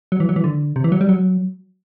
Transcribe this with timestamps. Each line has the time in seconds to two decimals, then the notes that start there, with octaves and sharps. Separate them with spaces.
0.12 F#3
0.20 E3
0.29 F#3
0.36 E3
0.44 D3
0.76 C3
0.84 E3
0.92 F#3
1.01 G3
1.09 F#3